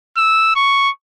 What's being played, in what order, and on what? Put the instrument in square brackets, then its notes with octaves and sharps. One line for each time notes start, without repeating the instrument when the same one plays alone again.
[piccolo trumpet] E6
C#6